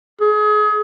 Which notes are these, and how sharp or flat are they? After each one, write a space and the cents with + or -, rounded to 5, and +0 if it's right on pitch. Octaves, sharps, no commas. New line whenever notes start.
G#4 +30